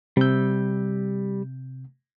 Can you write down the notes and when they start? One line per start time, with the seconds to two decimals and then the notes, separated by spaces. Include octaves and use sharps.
0.17 C3 G3 E6 G6